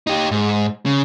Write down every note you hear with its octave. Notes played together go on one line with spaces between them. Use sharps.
D#4 G4
G#2
C#3